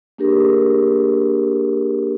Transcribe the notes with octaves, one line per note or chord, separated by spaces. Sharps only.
A#3 D4 G4 G#4 A#4